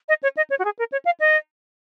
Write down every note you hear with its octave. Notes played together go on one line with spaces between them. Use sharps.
D#5
C#5
D#5
C#5
F#4
G#4
A#4
C#5
F5
D#5